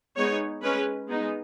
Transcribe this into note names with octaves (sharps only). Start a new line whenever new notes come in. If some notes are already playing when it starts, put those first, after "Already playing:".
G#3 B3 D#4 C#5
G#3 C#4 B4
G#3 B3 D#4